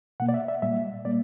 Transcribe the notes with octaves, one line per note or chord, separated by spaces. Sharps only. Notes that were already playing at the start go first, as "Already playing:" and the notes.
B2 A#3 F#5
D5
E5
E5
A#2 G3 A#3 E5
A#2 G3 A#3 D5